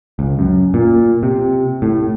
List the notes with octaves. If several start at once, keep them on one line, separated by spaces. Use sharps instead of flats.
C#2
F#2
A#2
C3
A2